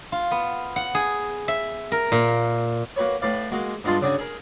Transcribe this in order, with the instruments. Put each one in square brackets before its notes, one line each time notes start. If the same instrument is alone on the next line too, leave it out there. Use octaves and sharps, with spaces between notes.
[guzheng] F4
B3
F#5
G#4
E5
A#4
A#2
[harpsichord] A#3 F#4 B4 C#5
A2 B4 D5 F5
G#3 A#3 F#4
G2 G#3 F4 F#5 A5 C6
C#3 D4 F#4 G#5
G#4 A#4